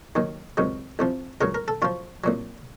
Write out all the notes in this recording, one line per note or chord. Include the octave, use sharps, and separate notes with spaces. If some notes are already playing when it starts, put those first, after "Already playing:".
D#2 D#3 F#3
C#2 C3 D#3 F#3
C2 C3 F3
C#2 C#3 F#3 A#4
A#4
A4
F#2 F3 F4
C2 A#2 F#3